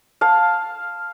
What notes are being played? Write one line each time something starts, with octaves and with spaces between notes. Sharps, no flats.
F5 A5